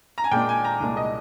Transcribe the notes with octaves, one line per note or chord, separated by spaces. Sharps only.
A#5
G#5
A#2 G#3 D4 G5
G#5
A#5
C2 A#2 G#3 D4
D#5